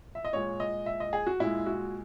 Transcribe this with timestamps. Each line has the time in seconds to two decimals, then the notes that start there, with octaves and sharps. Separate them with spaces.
0.15 E5
0.25 D#5
0.33 A#2 G#3 C#5
0.60 D#5
0.86 E5
1.00 D#5
1.13 G#4
1.27 F#4
1.40 A#2 G#3 E4
1.66 F#4